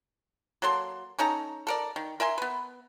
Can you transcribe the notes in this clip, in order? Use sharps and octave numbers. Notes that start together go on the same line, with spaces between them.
F#3 A#3 A4 C6
C#4 D#4 A4 A#5
A4 A#4 D5
D#3
A#4 E5 G#5 C6
B3 B4